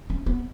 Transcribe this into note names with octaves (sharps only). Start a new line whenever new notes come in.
C#4
B3